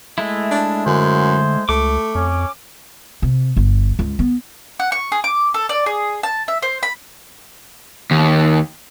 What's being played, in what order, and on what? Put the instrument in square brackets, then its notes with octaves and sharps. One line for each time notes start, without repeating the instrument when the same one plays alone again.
[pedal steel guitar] G#3 A3 E4
[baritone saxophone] D4
[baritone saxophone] F#2 [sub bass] D3 [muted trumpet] C5
[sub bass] C#2 [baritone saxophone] A3 [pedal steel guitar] D6
[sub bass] F2 [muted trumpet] C#4
[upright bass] C3
G1
C#2
B3
[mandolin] F#5
C#6
G#4
D6
A4
D5
G#4
A5
E5
C5
B5
[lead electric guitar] D#2